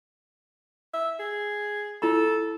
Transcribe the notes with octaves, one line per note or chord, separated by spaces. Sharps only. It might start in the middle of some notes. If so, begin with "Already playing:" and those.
E5
G#4
E4 A4 B5